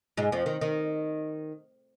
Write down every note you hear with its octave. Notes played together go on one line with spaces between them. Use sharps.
G#2 G#3
F2 F3
D#3
D#3